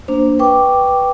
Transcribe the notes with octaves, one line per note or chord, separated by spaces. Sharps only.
A#3 D4 C5
B4 G5 C#6 D6